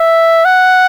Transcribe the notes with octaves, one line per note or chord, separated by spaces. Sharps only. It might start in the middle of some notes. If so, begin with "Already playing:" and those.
Already playing: E5
F#5